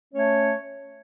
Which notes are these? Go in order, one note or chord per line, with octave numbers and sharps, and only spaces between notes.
A3 C#4 C#5